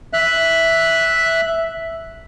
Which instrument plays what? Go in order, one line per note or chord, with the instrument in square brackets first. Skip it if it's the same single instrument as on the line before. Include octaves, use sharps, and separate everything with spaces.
[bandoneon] E5 F#6